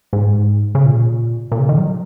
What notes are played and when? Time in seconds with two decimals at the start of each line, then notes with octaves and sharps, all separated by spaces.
0.13 G#2
0.75 C#3
0.86 A#2
1.52 A#2
1.59 C#3
1.69 D#3
1.78 F#3